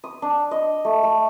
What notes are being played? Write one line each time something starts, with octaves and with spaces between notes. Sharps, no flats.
D#6
D4
D#5
A3
A3